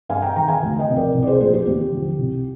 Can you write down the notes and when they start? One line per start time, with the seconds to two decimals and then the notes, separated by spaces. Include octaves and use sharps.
0.09 G2 F5 G#5
0.22 G5 A#5
0.36 D#3 G5 A#5
0.48 F5 G#5
0.62 D2
0.79 D#5 G5
0.88 C3 F3
0.97 A#4 D5
1.14 C2
1.22 D5
1.27 G#4 C5
1.40 A#2 F3 G#4 C5
1.54 G4
1.66 D#2 G4
1.92 D3 F3
2.18 C2